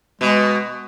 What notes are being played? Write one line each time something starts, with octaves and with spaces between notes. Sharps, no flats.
B2 G#3